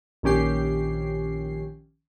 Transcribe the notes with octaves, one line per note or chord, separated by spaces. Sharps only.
A#1 D#3 C#4 G4 C7